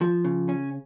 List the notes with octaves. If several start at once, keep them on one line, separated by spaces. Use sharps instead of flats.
F3
C#3
C#4